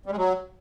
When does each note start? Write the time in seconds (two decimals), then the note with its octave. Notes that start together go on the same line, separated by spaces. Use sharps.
0.06 G3
0.11 G#3
0.17 F#3